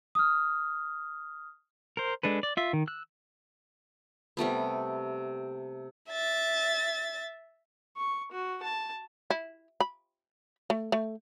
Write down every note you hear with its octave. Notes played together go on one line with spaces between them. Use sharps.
D#6 F6
A#4 C5
G#3 D4 A4 B4
D5
F4 E5
D#3
E6 F#6
C3 G3 A3 B3
E5 A6
C#6
F#4
A5
E4
B5
A3
A3